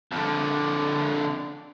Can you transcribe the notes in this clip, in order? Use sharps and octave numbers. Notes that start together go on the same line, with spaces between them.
F2 D3